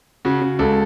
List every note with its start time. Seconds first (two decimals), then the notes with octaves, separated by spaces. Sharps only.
0.25 C#3 F#4
0.42 C#3
0.59 C#2 A4